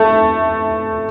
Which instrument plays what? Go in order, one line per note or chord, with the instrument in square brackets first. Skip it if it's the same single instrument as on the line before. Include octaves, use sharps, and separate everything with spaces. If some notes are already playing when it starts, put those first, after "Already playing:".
Already playing: [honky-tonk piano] A3